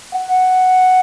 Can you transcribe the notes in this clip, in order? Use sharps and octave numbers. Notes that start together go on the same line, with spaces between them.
F#5